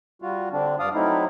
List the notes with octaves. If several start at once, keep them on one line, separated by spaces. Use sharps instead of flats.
G3 F4 F#4
D3 C4 D4
G2 D5 F5 D#6
F#3 A3 C4 D#4 E4